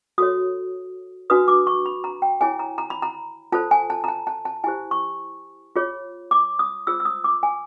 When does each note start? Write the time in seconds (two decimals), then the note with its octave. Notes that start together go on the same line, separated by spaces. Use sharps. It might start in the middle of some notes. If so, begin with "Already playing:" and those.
0.18 F#4 A4 C#5 D#6
1.30 D4 F#4 B4 D#6
1.48 D6
1.67 C#6
1.86 B5
2.04 A#5
2.22 G5
2.41 E4 G#4 C#5 G#5
2.59 A#5
2.78 A#5
2.90 B5
3.02 A#5
3.52 F4 A4 C5 A5
3.71 G#5
3.90 A5
4.04 A#5
4.08 A5
4.27 A5
4.45 A5
4.64 E4 G4 C5 G#5
4.91 C#6
5.76 F4 G#4 C#5
6.31 D6
6.59 D#6
6.87 F4 G#4 C5 E6
7.00 E6
7.05 D#6
7.24 D6
7.43 G#5